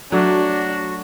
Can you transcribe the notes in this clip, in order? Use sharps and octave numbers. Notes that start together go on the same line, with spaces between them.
F#3 A3 D4 F#4